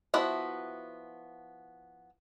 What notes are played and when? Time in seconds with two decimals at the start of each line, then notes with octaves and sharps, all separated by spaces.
0.14 F3 B3 E4 F#4 E5